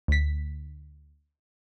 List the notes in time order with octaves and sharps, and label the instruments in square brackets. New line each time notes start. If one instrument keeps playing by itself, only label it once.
[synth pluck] D2 B6